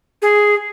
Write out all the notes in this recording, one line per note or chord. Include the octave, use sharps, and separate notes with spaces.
G#4